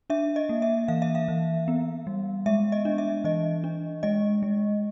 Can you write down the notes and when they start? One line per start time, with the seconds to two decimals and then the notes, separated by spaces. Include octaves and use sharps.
0.10 D4 E5
0.36 D#5
0.49 A#3
0.62 E5
0.88 E3 F5
1.02 E5
1.15 F5
1.28 E3
1.68 B3
2.07 G3
2.46 G#3 E5
2.72 D#5
2.85 D4
2.98 E5
3.24 E3 D#5
3.64 D4
4.03 G#3 D#5
4.43 G#3